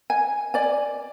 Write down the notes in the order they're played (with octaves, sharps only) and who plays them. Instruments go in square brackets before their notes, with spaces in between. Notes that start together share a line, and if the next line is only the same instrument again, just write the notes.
[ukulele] G#5
D5 G#5